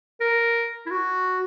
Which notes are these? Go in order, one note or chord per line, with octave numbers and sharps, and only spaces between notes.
A#4
E4
F#4